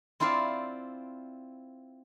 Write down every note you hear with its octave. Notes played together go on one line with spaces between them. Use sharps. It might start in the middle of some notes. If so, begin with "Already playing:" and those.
C4 E4 F4 C5 D5 F5